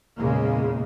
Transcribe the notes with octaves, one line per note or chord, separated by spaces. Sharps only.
E2 A#2 C#3 G#3 A#3